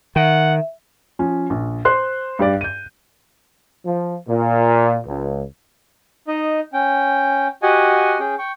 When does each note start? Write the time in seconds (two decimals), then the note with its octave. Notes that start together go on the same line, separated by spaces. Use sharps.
0.16 D#3 E5 F#5
1.19 F3 C#4
1.50 A#1
1.85 C5 C6 F#6
2.39 G2 G4 D5
2.61 G6 D#7
3.85 F3
4.27 A#2
5.07 C#2
6.27 D#4 D#5
6.73 C#4 G5
7.63 F#4 G4 D#5 F#5 G#5
8.20 C#4 G#4 G5
8.39 G5 C#6